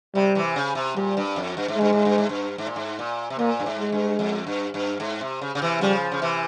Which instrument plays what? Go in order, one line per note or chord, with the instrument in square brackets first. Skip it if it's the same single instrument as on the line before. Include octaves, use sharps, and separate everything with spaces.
[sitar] C3 [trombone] G3
[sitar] C3 E3
C#3
C3
[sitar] A#2 [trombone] G3
[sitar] G2
F2
G2
G#2
[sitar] G2 [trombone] G#3
[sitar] G#2
G2
G#2
G2
G#2
A#2
G#2
A#2
C3
[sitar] A#2 [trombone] A#3
[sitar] G2
G#2
[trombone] G#3
[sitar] G2
F2
G2
G2
G#2
C3
C#3
C#3
C3 E3
[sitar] C#3 F3 [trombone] G3
[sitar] C#3
C3 E3